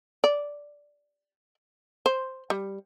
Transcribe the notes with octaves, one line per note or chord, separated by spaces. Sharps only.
D5
C5
G3